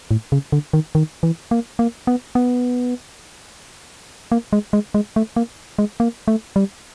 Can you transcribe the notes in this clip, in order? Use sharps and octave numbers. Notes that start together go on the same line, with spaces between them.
A2
C#3
D3
D#3
D#3
E3
A#3
A#3
B3
B3
A#3
G#3
G#3
G#3
A3
A#3
G#3
A#3
A3
G3